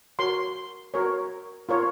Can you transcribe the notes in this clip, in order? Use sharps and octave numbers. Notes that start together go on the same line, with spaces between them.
F#4 A#4 C#5 C6
F#4 A#4 C#5
F4 A#4 C#5